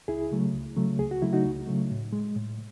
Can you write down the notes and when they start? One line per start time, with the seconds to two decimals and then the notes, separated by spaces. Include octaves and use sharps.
0.08 C#2 E4 G#4
0.32 C#3 F#3 A3
0.54 C#2
0.76 C#3 F#3 A3
0.99 C#2 G#4
1.11 F#4
1.22 C#3 F#3 A3 E4
1.33 D#4 F#4
1.45 C#2
1.67 C#3 F#3 A3
1.91 A2
2.13 G#3
2.36 A2